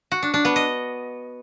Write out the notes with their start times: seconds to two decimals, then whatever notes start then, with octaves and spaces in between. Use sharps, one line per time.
0.12 F#4
0.23 D4
0.34 D4
0.45 B3
0.56 D#5